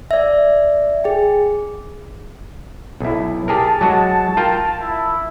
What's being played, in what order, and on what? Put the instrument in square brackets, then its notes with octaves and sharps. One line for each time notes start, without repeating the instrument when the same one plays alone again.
[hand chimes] D5 E5
G#4 G5
[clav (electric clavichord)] B1 E4
[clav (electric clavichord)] G4 G#4 A#4 [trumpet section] A5
[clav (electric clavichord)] F#3 G#3 F#4
F4 A#4 G5
[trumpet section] E4